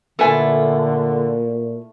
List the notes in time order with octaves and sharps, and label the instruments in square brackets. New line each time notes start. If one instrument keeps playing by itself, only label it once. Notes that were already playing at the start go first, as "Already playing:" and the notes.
[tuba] A#2 [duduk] D3 [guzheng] A3 E4 F4 [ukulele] A4 B4 G#5